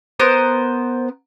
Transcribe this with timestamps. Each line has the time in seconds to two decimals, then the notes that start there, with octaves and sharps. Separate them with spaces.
0.20 B3 A#4 C5